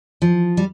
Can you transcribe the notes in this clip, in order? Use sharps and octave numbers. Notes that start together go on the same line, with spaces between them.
F3
G3